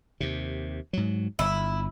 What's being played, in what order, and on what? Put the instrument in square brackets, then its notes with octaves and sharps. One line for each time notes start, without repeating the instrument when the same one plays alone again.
[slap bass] D#2 C3
G#2 F#3
[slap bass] G1 [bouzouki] E4